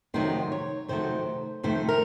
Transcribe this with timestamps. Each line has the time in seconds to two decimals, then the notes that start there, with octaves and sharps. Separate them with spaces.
0.14 F2 C3 D#3 F#3 A3 C5
0.52 C#5
0.88 F2 C3 D#3 F#3 A3 C5
1.63 F2 C3 D#3 A3 C5
1.89 A#4